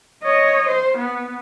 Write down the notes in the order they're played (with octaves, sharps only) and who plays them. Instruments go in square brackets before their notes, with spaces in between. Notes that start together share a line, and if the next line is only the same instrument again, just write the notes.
[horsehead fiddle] C#5 D#5
C5
B3